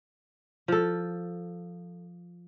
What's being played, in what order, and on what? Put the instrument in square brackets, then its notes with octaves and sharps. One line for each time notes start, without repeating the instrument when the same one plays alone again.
[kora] F3 A4